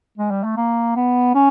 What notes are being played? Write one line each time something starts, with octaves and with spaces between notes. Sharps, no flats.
G#3
G3
A3
A#3
B3
C#4